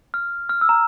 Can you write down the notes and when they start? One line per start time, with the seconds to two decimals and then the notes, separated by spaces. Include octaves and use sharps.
0.14 F6
0.49 F6
0.61 E6
0.69 A#5